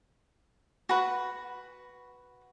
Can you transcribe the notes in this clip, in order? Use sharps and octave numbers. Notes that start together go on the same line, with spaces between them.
F#4 B4